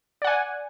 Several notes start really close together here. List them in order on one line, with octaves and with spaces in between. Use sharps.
D5 F#5 G#5